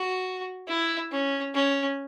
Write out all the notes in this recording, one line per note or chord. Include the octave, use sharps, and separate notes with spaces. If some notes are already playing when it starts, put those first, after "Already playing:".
Already playing: F#4
E4
C#4
C#4